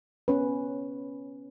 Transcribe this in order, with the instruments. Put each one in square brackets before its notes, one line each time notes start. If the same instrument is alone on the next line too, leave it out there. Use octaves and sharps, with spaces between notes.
[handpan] B3 C#4 B4